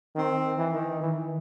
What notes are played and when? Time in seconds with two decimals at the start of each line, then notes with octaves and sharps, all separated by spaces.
0.15 D#3 C4
0.44 D#3
0.58 E3
0.73 D#3
1.01 D#3 E3